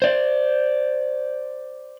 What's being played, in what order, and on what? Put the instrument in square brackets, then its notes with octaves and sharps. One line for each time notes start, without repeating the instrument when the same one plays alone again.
[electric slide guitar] C5 D5